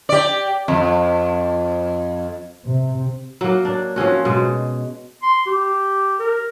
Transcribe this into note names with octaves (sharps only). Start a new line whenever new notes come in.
G4 D5
F2
C3
F#3 A#3
D4
F3 C4 C#4 F#4
B2 G#3
C6
G4
A#4